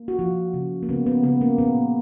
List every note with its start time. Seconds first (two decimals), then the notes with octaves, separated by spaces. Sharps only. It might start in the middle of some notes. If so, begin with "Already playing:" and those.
Already playing: A#3
0.08 F#4
0.19 F3 F4
0.54 C#3
0.83 A#3
0.89 C#3 B3
1.06 B3
1.23 C#3 B3
1.41 A#3
1.58 A#2 B3